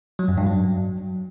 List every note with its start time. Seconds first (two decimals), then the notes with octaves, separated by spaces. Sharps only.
0.19 F#3
0.28 F#2
0.38 G2
0.47 F#3